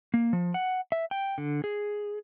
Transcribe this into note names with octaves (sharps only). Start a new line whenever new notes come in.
A#3
F3
F#5
E5
G5
D3
G#4